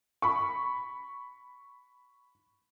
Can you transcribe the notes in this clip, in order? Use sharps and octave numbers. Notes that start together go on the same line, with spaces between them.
B5 C#6